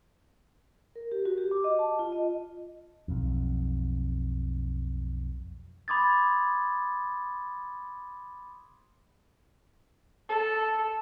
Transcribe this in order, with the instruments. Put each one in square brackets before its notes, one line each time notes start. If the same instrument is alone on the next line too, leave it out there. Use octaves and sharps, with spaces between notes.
[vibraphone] A#4
G4
F#4
G4
D6
D#5
A5
F4
D#5
[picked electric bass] B1 F2
[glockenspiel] B5 C6 D6 D#6 G#6 A6
[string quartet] A4